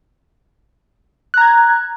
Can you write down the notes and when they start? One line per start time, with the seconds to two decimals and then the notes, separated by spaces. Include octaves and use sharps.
1.34 F#6
1.37 A#5
1.41 G#6